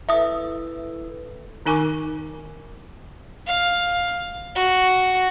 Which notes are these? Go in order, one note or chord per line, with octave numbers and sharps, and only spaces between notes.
E4 A4 B4 E5 D#6
D#3 D#4 A#4 G#5 C#6 D6
F5
F#4